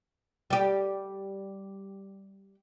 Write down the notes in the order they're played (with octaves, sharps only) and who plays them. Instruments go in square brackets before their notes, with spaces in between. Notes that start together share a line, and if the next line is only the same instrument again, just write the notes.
[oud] G3 G4